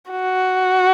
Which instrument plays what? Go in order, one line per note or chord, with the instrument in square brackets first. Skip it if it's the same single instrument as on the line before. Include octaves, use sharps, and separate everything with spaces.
[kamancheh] F#4